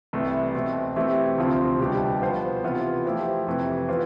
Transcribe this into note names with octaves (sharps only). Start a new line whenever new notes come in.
C2 C3 E3 A3
B2 A3 C4
E3 A3 C4 E4 G4
D2 C3 F3 C4 F4
C2 B2 G3 D4 G4
F3 B3 F4 C5
C3 E3 B3 F4 B4
F3 A3 E4 G4 C5
F2 C3 E3 A3
E3 B3 F4 C5